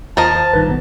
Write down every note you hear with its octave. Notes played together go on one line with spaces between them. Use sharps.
D#2 F3 A#4 D#5 A5
C5 A#5
A1 G2 D#3 B4
B1 B3